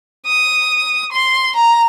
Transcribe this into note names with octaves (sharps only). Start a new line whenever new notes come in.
D#6
C6
A#5